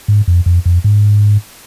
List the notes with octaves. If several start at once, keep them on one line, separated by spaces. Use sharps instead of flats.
G#2
F2
F2
F2
G#2